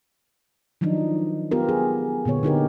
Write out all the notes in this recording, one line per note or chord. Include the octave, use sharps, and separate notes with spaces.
D#3 F3 F#3 D4 D#4
B3 F4 G4 A#4
G#4
A#2 D3 B3 C#5
D3 D#4 G4 A#4